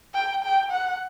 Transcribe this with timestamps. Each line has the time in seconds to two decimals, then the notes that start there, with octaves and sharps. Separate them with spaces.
0.14 G5
0.43 G5
0.71 F#5